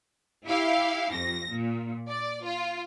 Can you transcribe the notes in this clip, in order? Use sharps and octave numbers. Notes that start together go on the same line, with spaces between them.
E4 G4 F5
F2 A#6
A#2
D5
F4